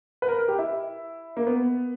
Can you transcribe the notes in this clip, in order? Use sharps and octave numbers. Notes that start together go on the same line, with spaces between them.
B4
A#4
A#4
G4
E4
A#3
B3